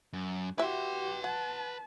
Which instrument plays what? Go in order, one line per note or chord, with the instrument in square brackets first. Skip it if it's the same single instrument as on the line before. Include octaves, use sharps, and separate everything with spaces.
[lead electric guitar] F#2
[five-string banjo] E4 E5 [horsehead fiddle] F#4 G4 [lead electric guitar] B4 C6
[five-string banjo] F#5 [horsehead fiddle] A5